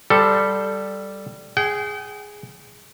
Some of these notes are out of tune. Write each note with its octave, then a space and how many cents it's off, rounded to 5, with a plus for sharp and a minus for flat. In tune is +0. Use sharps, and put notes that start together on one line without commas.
G3 +0 A4 +0 C5 -15
G#4 +0 G5 -40